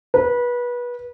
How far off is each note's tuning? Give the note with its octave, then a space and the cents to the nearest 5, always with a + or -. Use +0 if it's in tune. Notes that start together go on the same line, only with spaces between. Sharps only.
B4 -25